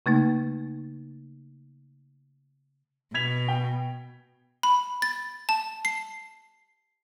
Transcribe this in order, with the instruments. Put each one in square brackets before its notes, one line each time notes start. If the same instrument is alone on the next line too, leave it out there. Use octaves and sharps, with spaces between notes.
[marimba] C#3 A3 A#3 D#4
[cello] B2 [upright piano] G#6 B6 F7
[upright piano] G5
[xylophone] B5
A6
A5
C7